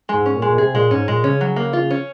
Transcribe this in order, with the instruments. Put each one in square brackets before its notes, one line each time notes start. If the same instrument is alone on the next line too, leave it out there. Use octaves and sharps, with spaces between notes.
[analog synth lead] G#2 [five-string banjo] G#3
[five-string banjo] C#4
[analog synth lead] A#2
[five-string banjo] G#3
[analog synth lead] A#2
[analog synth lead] C3 [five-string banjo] G#4
[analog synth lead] A#2 [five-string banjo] G#3
[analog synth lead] G#2 [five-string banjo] C#4
[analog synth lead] A#2 [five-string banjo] G#3
[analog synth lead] C#3 [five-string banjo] C#4
[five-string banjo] F#3
A#3
F4
C#4